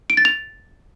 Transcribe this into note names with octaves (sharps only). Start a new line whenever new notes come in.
D7
A6
F7